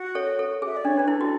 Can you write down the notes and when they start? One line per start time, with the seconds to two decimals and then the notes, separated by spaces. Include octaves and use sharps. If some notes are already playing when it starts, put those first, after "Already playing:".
Already playing: F#4
0.15 A4 C#5
0.39 A4
0.62 G#4 E5
0.77 D5
0.85 D4 C#5
0.97 D4 B4
1.08 E4 A4
1.21 F#4